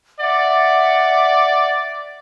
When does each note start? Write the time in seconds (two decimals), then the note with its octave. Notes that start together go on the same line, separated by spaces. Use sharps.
0.20 D5 E5 F#5